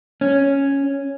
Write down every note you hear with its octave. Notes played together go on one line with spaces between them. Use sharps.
C#4